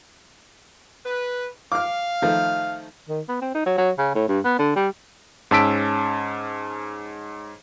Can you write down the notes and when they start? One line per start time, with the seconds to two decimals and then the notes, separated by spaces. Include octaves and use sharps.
1.05 B4
1.72 F5 D6 F6
2.22 D#3 F3 A3
3.09 D#3
3.28 B3
3.41 C4
3.54 D#4
3.66 F#3
3.77 F#3
3.98 C#3
4.15 A2
4.28 G2
4.44 B3
4.59 D3
4.76 G3
5.51 G#2 C#4 A5 E6 B6 D7